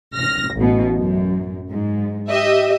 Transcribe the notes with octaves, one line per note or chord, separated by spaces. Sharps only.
F6 A#6
A1 B2
F#2
G#2
G4 D#5 E5